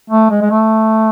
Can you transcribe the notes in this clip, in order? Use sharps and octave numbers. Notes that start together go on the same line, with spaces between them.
A3
G#3
G#3
A3